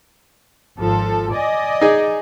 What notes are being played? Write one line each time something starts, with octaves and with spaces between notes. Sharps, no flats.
G#1 F3 A4
D5 D#5 G#5
D#4 G#4